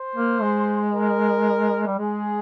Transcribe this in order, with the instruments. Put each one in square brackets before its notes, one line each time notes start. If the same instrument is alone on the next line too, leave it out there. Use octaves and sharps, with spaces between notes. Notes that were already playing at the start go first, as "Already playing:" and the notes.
Already playing: [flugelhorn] C5
[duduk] A#3
G#3
[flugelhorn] A#4
[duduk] G3
[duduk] G#3 [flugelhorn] G#4